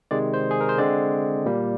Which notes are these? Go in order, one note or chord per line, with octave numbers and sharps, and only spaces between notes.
C3 D#3 G#3 D5
C5
G#4
A#4
C5
D3 G#3 C4 D5
A#2 G3 A#3